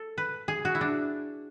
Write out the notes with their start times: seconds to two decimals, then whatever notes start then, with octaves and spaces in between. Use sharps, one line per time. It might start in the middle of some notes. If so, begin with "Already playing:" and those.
Already playing: A4
0.18 B4
0.48 G#4
0.65 F#4
0.75 E4
0.81 D4